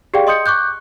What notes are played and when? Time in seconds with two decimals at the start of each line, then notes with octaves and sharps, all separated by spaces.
0.14 G4 G#4 D5 F5 G5
0.27 D#5 C6 D#6 G6 C#7
0.46 C#6 D6 F#6 G6